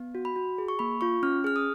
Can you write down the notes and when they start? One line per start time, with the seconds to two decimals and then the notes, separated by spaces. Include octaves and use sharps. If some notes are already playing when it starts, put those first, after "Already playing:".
Already playing: B3
0.15 F#4
0.25 B5
0.36 F#4
0.58 G#4
0.68 C#6
0.79 A#3 B5
1.01 F4 C#6
1.23 C#4 F6
1.44 G#4 F6
1.56 D#6